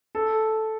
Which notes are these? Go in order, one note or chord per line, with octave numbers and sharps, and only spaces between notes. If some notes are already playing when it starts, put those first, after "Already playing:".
A4